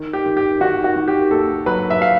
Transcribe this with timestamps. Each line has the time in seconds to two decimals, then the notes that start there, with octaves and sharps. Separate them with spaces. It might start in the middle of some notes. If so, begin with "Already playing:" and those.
Already playing: D#3
0.13 G4
0.26 D#3
0.37 G4
0.61 D#3 F#4
0.84 F#4
0.96 D#3
1.08 G4
1.31 D#2 A4
1.66 F#3 B4
1.90 E5
2.02 F5